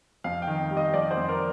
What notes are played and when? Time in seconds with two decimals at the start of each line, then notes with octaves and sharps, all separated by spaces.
0.24 F2 F5
0.42 G5
0.47 D#3
0.70 G3
0.77 D#5
0.94 F2 D5
1.11 C5
1.17 F2
1.29 A#4